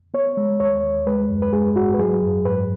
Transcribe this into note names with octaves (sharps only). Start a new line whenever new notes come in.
B3 C#5
G#3
D#2 C#5
D#2
G#3 B4
F#2
B4
G#3 G#4
G#2 F#4
B4
F#3 G#4
F#2
G#2 B4